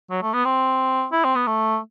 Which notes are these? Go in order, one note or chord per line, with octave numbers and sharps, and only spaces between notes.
F#3
A3
B3
C4
E4
C4
B3
A3